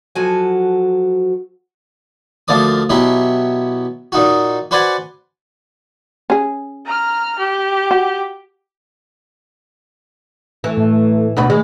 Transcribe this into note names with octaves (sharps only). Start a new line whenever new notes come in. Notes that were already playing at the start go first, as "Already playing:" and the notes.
F3 F#3 F#4 A4 G#5
D2 F3 A#3 D5 D#6
B2 F#3 E4 G4
A#2 D#4 F#4
F#4 B4 C5 D5 F#5 G#5
C#4 G#4
A#5 F6
G4
F#4
E3 A3
A2
D2 B2 B4
D#3 G#3